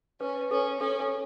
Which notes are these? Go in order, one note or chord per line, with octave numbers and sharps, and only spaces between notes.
C#4 B4
C#4 A4
C#4 A4
A4